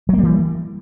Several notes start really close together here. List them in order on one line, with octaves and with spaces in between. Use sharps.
F#3 A#3 G3 E3